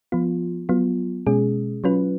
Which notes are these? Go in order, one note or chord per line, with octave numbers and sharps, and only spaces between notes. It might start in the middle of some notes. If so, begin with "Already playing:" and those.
F3 B3 F4
F#3 B3 F4
B2 G#3 C#4 G#4
F#3 C#4 F4 B4